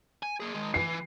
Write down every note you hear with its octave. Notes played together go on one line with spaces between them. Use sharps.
G#5
A#3 G#4
D#3 G#3
E3 C7